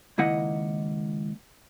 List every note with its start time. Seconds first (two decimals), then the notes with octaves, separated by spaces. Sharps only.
0.18 C#2 D#3 A#3 E4 D#5 F#5